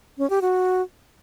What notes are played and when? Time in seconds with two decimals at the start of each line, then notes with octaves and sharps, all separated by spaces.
0.18 C#4
0.30 G4
0.42 F#4